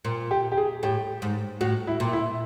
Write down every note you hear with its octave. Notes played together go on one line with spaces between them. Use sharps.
A#2
G4
G4
G#4
A2 G4
G#2
A2 F#4
E4
A#2
E4